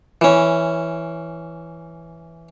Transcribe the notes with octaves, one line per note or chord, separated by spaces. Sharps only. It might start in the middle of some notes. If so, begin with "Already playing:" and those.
E3 C#4